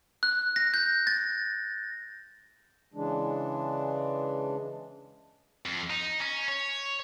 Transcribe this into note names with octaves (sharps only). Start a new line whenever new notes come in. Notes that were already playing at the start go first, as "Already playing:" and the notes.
F#6
A#6
G6
A6
C#3 E3 G#3 D4
F2
D#4
C#4
C#5